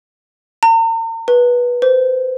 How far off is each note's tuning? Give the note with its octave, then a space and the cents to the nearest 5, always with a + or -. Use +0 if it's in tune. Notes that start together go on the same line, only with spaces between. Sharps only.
A#5 -45
B4 -20
C5 -30